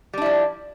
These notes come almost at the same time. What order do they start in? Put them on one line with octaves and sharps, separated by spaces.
G3 D4 E4 F3